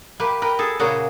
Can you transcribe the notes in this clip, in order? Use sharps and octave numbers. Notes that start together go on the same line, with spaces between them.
A#3 G4 B4
A#4 B4 G5
G#4 A4
A#2 C#3 A#3 F#4 G#4